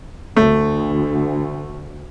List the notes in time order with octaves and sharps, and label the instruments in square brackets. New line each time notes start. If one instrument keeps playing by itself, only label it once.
[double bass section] D2 [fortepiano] A3